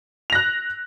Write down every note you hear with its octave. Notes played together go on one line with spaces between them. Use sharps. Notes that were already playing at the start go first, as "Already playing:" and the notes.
F#6 A#6 F7